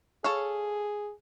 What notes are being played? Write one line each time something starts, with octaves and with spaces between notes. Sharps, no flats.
G#4 A4 C#5 F5